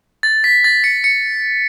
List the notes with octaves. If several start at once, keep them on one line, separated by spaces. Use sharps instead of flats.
A6
B6
A6
C#7
C#7